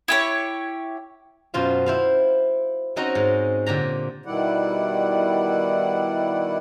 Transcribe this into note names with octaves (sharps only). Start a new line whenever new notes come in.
E4 G4 C#5
F#2 B2 F4 C5 F5
E4 C5 F5
C4 C#4 D#4 F#4 D#5 A#5
G#2
A#2 D3 G4 A#5
B2 D#3 G3 E4 D5 F#5